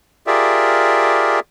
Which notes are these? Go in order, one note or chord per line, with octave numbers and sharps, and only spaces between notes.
F4 G4 G#4 A#4 D5 E5